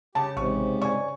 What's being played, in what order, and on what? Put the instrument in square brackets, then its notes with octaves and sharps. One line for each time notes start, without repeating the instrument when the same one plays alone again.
[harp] C#3 [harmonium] G4 [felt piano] A5
[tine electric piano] A1 [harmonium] G#2 C3 [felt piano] C#6
[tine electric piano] D5 G#5 [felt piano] C#6